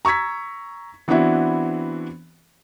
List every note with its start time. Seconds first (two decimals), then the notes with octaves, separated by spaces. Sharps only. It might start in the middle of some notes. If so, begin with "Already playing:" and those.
0.05 A#5 C#6 E6 G#6 B6
1.08 E3 B3 C4 D4 E4 F#4